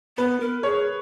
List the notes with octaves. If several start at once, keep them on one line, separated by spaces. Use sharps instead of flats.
B3 B4
A#4
G#4 C#5